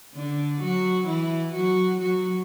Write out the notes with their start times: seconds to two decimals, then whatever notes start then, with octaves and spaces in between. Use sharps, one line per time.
0.14 D3 D4
0.61 F#3 F#4
1.07 E3 E4
1.54 F#3 F#4
2.00 F#3 F#4